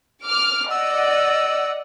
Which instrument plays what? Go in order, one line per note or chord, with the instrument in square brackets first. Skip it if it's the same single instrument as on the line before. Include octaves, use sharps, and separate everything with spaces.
[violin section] D6 F6
[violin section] D5 D#5 F#5 [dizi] E6